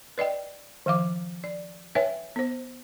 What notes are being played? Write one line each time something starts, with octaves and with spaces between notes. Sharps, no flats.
B4 D5 D#5 G5
D#3 F3 F5 D6
D5
B4 C#5 E5 G5 G#5
B3 C5